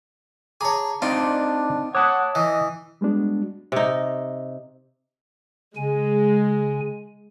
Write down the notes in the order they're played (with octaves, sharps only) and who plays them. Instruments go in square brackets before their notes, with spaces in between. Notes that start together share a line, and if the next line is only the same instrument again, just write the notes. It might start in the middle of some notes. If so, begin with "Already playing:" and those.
[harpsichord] G#4 C#5 [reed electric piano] A5 A#5 D6
[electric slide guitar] C4 D#4 D5 [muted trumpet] D4 [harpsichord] F4
[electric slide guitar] C#5 A5 [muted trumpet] F#5 [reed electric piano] D6 D#6 F#6
[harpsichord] E3 [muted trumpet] D#5
[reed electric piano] G3 G#3 B3 D4 F#4
[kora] C3 D#4
[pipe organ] C#3 G#5 [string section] G#3